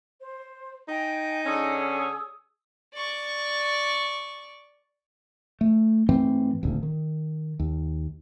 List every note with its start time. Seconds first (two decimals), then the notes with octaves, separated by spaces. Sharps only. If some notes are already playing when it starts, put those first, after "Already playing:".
0.21 C5
0.88 D#4 G5 G#5
1.46 D3 C#4 G#4 D#6 E6
2.95 D5 C#6
5.61 A3
6.09 G#2 E3 A3 C4
6.63 D#1 G#1 D2
6.83 D#3
7.59 D#2